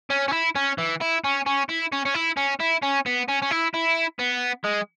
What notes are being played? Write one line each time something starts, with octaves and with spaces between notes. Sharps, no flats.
C#4
C#4
E4
C#4
E3
E4
C#4
C#4
E4
C#4
C#4
E4
C#4
E4
C#4
B3
C#4
C#4
E4
E4
B3
G#3